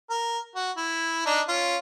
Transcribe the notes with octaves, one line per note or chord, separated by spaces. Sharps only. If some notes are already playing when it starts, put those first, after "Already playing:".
A#4
F#4
E4
D4 D#4
C#4 F4